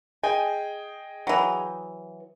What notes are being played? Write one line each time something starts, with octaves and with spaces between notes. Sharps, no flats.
G#4 D#5 G5 G#5
E3 F#3